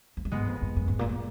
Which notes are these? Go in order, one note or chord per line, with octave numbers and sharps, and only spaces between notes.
F2
F#2
G#2 G#3 B3
F2
F#2
F#2
G#2
A#2
A#2